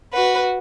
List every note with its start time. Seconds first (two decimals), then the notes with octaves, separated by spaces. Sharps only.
0.13 F#4 B4